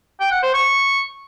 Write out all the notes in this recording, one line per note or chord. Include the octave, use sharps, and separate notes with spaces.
G5
F#5
C5
C#6